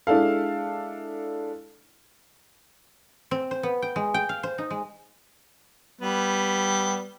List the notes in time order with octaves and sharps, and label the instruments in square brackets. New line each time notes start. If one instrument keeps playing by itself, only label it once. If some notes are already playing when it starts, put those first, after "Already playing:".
[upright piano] G#3 D4 E4 A4 F5
[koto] C4
C5
B3
G5
G#3
G5
F5
C5
D#4
G#3
[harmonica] G3 B3